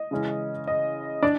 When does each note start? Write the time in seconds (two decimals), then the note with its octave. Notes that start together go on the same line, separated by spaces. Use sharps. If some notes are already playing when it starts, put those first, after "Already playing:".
Already playing: D#5
0.11 C#3 E3 G#3 C#4
0.67 D#5
1.23 D4 D5